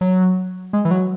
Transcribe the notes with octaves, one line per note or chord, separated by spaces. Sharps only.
F#3
G#3
E3
F#3